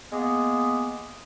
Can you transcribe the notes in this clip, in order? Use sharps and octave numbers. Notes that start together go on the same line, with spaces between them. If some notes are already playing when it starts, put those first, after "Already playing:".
G#3 A#3 B3